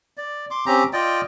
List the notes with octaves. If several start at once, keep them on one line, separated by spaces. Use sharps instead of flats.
D5
C6 D6
C4 C#4 G4 A#5
F4 D5 D#5 G5